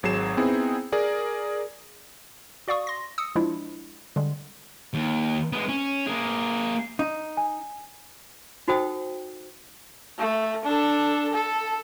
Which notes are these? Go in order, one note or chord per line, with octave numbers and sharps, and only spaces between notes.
G#1 F#3 G#4 C7 E7
B3 C4 D#4 E4 G#4
G#4 A#4 D5
F#4 D5 F5 C#6 D#6
C6 A#6
D#6 E6 C#7
F3 G#3 D4 E4 F4
D3 G3 G#3
D#2
G#3 B3
C#4
A#3 G#4
D#4
G#5
D#4 F#4 A4 C5 G5 D#6
A3
D4 A4
A4